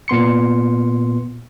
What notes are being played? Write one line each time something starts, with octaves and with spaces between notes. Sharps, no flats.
A#2 B3 C6 C#7